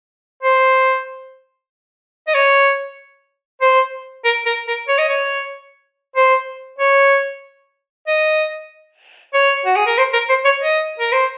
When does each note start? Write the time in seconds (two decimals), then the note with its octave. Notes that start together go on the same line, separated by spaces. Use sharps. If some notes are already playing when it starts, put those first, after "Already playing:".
0.43 C5
2.28 D#5
2.34 C#5
3.61 C5
4.25 A#4
4.46 A#4
4.68 A#4
4.88 C#5
4.98 D#5
5.09 C#5
6.16 C5
6.79 C#5
8.07 D#5
9.34 C#5
9.65 F#4
9.76 G#4
9.86 A#4
9.97 C5
10.13 A#4
10.29 C5
10.45 C#5
10.61 D#5
10.99 A#4
11.12 C5